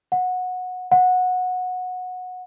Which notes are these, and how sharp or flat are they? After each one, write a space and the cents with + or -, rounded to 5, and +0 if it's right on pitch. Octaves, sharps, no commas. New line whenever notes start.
F#5 -15
F#5 -15